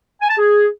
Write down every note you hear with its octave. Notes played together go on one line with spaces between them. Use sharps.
G#5
A5
G#4